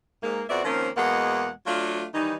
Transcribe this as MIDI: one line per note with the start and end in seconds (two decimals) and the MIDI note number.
0.23 0.43 44
0.23 0.43 58
0.49 0.63 41
0.49 0.63 59
0.49 0.63 60
0.49 0.63 66
0.49 0.63 74
0.49 0.63 76
0.64 0.89 51
0.64 0.89 53
0.64 0.89 58
0.64 0.89 60
0.64 0.89 61
0.64 0.89 70
0.96 1.50 40
0.96 1.50 47
0.96 1.50 56
0.96 1.50 58
0.96 1.50 78
1.67 2.05 54
1.67 2.05 57
1.67 2.05 62
1.67 2.05 65
2.14 2.36 51
2.14 2.36 52
2.14 2.36 55
2.14 2.36 63